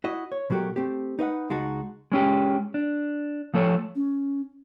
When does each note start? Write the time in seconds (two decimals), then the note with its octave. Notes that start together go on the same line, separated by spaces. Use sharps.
0.04 E4 F#4 D#5
0.32 C#5
0.50 B2 F#3 A3 F#4 G4 A#4
0.76 A3 C4 G4
1.19 D#4 B4 E5 F#5
1.50 C#2 G#3 D#4 F#4 A5
2.12 G#3 C#4 G4
2.74 D4
3.54 F3 A3 A4 C#5
3.95 C#4